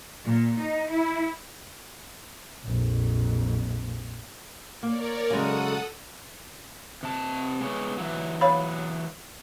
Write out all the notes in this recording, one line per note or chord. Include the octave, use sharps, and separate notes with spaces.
A#2
D#4
E4
A#1 F2
A#3 A#4 C#5 D5
C#3 F#3 G#3 A4 F#5 D#6
C3 A5
G#3 B3 C#5
E3 F#3
C#5 F5 B5